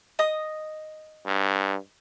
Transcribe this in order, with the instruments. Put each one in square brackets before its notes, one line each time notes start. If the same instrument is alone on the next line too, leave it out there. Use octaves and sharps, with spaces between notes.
[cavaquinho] D#5 D#6
[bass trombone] G2